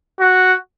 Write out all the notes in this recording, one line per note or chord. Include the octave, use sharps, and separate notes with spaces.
F#4